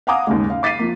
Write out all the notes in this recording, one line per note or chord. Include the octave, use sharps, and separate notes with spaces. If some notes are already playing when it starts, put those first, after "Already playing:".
F5 F#5 G#5 A#5 D6 D#6
D#2 G#2 C#3 G#3
F5
D6 A6 B6 C7 D#7
F3 A#3